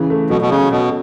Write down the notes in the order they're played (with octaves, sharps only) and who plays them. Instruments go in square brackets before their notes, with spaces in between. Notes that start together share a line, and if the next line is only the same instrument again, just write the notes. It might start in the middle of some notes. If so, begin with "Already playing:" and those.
Already playing: [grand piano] C#3 E3
A3
[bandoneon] B2 [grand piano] F#3
[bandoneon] B2
[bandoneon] C#3 [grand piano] C#4
[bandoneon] B2 [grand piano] A4